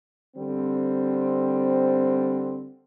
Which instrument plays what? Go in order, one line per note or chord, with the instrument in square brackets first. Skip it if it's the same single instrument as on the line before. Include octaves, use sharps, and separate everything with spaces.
[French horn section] D3 G3 C4